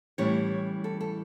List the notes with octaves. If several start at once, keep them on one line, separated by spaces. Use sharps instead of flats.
A2 E3 G3 C#4 C#5
A4
A4